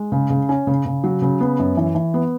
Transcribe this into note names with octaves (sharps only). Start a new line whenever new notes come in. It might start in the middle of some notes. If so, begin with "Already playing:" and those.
Already playing: G#3
C#3
C#3
C#4
C#3
C#3
F#3
C#3
B3
F#2
E3
E3
B3